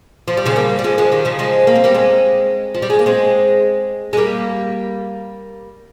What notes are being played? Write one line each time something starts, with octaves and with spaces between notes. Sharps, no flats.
F3
G3
C#3 F3
G3 A#3
G3
F3 G#3
F3 G#3
D#3 G3
C#3 F3
F3 G#3
A#3
C4
G3 A#3
G#3 C4
F3
G3
G#3
A#3
G#3 C4
G#3
G3 A#3